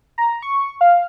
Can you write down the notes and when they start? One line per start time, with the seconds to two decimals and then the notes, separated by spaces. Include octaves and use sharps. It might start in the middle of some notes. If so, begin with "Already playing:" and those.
0.18 A#5
0.42 C#6
0.81 F5